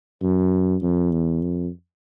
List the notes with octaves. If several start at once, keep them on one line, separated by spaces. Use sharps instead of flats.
F#2
F2
E2
F2